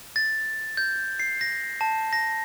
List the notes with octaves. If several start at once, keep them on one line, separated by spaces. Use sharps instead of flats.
A6
G6
C7
A#6
A5
A#6